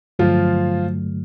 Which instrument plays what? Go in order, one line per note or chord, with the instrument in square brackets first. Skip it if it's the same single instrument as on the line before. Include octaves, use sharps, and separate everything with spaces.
[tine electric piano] G2 D3 F#3 A3 [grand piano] F3 F4